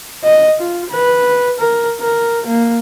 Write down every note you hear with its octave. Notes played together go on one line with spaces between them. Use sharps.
D#5
F4
B4
A#4
A#4
A#3